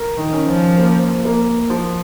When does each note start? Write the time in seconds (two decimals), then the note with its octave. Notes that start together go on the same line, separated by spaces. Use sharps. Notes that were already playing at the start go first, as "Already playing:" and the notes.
Already playing: A#4
0.17 D#3
0.33 C#4
0.47 F3
0.78 A#3
1.25 A#3
1.70 F3